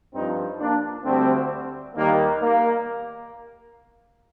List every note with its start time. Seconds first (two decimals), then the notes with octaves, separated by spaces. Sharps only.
0.14 G2 F3 C4 D#4
0.59 A#3 D4
1.04 D2 D3 G3 A3 C4
1.96 D#2 D#3 G3 A#3
2.42 A#3